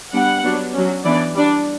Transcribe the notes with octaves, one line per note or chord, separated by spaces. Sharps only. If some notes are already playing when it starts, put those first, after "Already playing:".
G3 B3 D4 F#5
F#3 B3 D4
F#3 C#4
E3 B3 D4 D5
G3 D4 D5